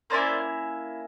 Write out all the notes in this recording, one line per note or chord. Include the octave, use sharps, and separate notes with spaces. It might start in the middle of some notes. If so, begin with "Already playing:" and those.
A#3 C#4 E4 C5 D5